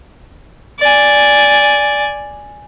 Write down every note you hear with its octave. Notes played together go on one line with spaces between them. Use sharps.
D5 G#5